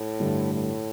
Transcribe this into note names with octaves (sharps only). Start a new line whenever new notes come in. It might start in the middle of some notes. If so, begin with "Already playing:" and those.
Already playing: A2
G2 D3 A3
A2